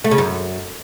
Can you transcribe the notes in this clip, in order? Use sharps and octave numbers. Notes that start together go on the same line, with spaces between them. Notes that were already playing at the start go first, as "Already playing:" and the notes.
A3
C#3
F#2